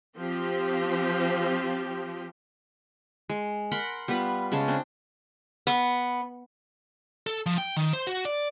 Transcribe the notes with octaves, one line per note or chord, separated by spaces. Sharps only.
F3 C4 G4
G#3
A#4 F#5 B5 C6
G3 B3 F4 B4
C#3 G#3 C#4 A5
C4 D4
B3
A4
F3
G5
D#3
C5
F#4
D5